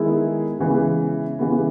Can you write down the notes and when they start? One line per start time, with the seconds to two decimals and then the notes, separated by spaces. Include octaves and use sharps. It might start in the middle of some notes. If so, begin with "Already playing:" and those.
Already playing: D#3 G#3 B3 E4 G#4
0.59 C#3 E3 G#3 B3
1.39 C#3 E3 G#3 B3